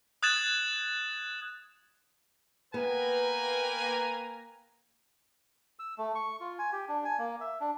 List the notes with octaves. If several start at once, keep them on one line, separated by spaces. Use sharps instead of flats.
D#6 F#6 G#6 A6 E7 F#7
A#3 B3 B4 G5 G#5 A#5
E6
A3
C#6
F4
G#5
G4
D4
G#5
A#3
E5
D4